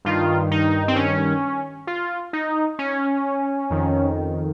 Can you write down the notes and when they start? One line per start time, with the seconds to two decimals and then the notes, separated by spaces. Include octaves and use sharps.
0.05 G2 D#3 F4
0.51 D#4
0.88 C4
0.96 C#4
1.87 F4
2.33 D#4
2.79 C#4
3.70 F2 D#3